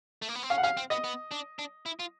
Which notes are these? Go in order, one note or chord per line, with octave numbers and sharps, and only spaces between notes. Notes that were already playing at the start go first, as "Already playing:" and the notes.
A3
A#3
B3
C4
C#4 F5
F#5
C#4 F5
C4
B3 D#5
B3
D4
D4
E4
F4